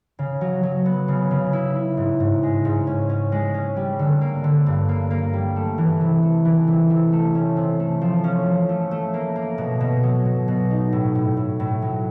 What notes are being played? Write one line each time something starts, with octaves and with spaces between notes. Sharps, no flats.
C#3
F#3
F#3
B3
C#3
C#3
E4
E4
G#2
G#2
G#3
G#2
C#4
C#4
G#3
C#4
G3
D3
A#3
D3
G2
A#3
A#3
G3
A3
E3
C3
A3
E3
C3
C3
A3
C#4
C3
A3
F3
C#4
F3
A3
A3
A#3
A#3
B2
B2
F#3
B2
B2
D#4
A2
A2
A2
A2
F#3